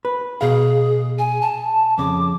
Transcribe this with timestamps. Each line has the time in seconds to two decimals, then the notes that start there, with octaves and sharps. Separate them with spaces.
0.05 B4
0.41 B2 G#4 F5
1.19 G#5
1.41 A5
1.98 F2 C#3 D6